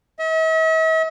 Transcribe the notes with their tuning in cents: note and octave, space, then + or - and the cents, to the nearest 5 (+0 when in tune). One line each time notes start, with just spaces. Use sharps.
E5 -45